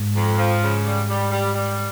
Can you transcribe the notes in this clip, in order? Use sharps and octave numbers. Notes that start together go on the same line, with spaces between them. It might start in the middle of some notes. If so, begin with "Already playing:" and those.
Already playing: G#2
F2
F3
C#3
G3
G3
G3
G3